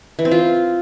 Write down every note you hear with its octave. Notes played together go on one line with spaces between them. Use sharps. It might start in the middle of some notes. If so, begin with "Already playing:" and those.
E3
C4
F4